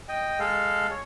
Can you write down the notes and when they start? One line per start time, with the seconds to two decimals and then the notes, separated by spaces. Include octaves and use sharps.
0.09 D#5 G5
0.40 G#3 A4 F5
0.91 C#5